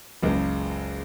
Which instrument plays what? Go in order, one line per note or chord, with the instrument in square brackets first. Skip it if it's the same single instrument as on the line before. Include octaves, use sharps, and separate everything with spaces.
[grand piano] F#1 C#2